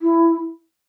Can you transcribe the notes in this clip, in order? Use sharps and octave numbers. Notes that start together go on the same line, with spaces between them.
E4